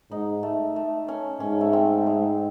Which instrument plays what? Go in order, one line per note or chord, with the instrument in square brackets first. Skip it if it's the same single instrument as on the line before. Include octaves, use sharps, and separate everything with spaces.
[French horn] G#2 [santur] D#4
[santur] A3
A3
C#4
[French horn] G#2 [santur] C#4
[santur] A3
C4
G#3